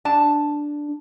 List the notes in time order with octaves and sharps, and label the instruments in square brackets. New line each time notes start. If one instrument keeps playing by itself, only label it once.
[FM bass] D4 [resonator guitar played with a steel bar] A5